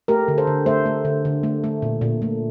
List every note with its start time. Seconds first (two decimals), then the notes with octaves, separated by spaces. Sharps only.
0.08 A3 G4 A#4
0.28 D3
0.38 A4 C5
0.47 D3
0.66 A3 C5 E5
0.86 A3
1.05 D3
1.25 D3
1.43 A3
1.64 A3
1.82 A#2
2.01 A#2
2.22 A3